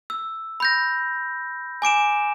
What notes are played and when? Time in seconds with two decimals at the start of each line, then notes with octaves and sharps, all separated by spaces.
0.10 E6
0.60 B5 G6 A#6
1.82 G#5 D6 D7 E7